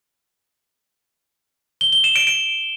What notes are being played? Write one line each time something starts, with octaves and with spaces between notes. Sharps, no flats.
G7
G7
E7
D7
D7